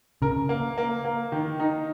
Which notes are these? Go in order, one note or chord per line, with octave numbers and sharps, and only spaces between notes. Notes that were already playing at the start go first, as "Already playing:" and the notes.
C#3 A#4
A#3
A#3
A#3
D#3
D#4